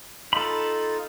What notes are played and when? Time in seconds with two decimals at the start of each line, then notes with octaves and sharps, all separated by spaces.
0.33 D#4 F4 A4 B5